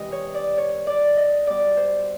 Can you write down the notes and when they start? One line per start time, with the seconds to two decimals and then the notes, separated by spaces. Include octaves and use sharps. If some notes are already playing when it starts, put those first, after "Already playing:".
Already playing: C3 E3 G#3 D#5
0.12 C#5
0.34 D5
0.58 C#5
0.87 D5
1.17 D#5
1.47 B2 G3 D5
1.77 C5